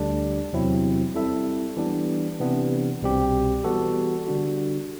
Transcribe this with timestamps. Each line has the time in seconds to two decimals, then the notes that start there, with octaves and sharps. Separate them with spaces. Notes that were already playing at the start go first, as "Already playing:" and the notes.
Already playing: D2 D3 G3 D4
0.53 E2 C3 F#3 C4 E4
1.15 G3 C4 E4 A4 E5
1.77 E3 G3 B3 D4
2.40 C3 E3 B3 D4
3.02 C2 B2 G3 C4 G4
3.64 E3 G3 B3 F#4 A4
4.27 D3 G3 D4 F#4